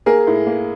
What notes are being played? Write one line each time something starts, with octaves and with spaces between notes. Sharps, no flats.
A#3 G#4 A#4
A2
A#3